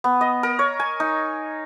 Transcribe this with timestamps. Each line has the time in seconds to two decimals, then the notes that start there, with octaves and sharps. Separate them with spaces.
0.04 B3
0.21 D#5
0.43 A#4
0.59 C#5
0.80 G#5
1.00 D#4